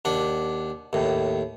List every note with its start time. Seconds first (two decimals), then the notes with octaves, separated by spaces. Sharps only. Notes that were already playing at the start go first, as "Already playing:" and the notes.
0.05 D#2 D4 F#5
0.93 D#2 A2